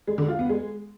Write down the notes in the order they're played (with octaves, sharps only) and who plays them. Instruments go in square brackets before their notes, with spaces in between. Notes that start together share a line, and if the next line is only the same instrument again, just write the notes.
[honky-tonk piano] G#3
D3
F4
B3
G#3